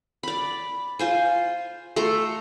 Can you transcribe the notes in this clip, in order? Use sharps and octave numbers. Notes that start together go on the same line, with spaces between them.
D5 B5
F4 C5 G#5
A3 A4 A#5 C6